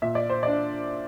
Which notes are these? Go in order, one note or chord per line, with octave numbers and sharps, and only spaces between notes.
A#2 E5
D5
C5
D4 D5